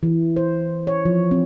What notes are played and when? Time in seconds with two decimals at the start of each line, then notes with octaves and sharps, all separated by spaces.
0.03 E3
0.36 C5
0.87 C#5
1.05 F3
1.31 C4